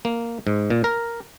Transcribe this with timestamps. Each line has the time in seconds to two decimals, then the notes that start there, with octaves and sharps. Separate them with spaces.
0.05 A#3
0.47 G#2
0.70 A#2
0.84 A#4